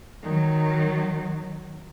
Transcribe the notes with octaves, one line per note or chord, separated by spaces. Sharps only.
D#3 F#3